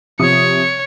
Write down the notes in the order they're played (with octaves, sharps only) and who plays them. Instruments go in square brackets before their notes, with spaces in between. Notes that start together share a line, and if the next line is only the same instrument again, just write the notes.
[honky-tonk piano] C3 F3 D#6 [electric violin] C#5 C#7